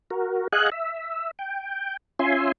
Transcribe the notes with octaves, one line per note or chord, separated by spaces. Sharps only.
F#4 A#4
G#4 D#5 F5 F#5 G#5 F#6
E5
G5
C#4 F4 E5 G#5 C6